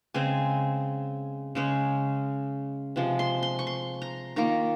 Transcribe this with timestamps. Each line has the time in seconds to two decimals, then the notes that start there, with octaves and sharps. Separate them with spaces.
0.14 C#3 G#3 C4 G#5
1.55 C#3 G#3 C#4
2.96 C3 F3 G#3
3.19 C6
3.43 C6
3.59 C#6
3.67 C6
4.02 A#5
4.36 D#3 A#3 F4 A#5